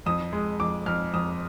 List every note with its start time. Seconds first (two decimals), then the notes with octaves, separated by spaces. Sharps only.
0.06 F2 D#6
0.33 G#3
0.60 F2 D6
0.86 F2 F6
1.14 F2 D#6